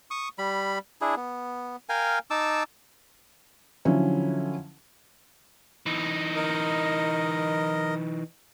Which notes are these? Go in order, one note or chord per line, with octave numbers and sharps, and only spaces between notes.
C#6 D#6
G3 B5
D4 E4 G#4
B3
A#4 F5 G5 G#5
D#4 A5 D6 E6
D3 F3 F#3 C#4 E4
E3 D#4
A#4 D#5